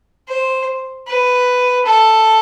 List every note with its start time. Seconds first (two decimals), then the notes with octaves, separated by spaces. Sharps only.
0.28 C5
1.07 B4
1.85 A4